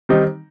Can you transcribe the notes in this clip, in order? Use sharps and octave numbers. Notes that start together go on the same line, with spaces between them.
D#3 G3 C4 D#4